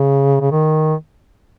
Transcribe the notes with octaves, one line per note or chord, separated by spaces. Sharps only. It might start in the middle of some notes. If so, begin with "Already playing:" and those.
Already playing: C#3
C#3
D#3